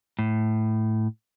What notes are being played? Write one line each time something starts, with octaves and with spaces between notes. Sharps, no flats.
A2